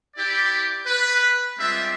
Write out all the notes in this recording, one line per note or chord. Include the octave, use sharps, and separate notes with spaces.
E4 G4 D5
B4
G3 G#3 C4 D4 F4 E5